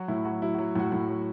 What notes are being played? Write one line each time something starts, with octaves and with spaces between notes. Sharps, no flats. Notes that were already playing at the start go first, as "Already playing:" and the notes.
Already playing: F#3 F#4
A2 E4
F#3 F#4
F#3 E4
F#3 F#4
A2 F#4
A2
F#3